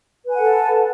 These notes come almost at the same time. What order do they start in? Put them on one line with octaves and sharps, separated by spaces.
B4 G#5 F#5 A4